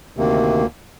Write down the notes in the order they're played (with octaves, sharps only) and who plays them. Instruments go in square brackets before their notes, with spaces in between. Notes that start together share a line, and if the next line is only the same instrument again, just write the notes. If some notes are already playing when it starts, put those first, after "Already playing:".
[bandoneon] D2 C3 D#3 A#3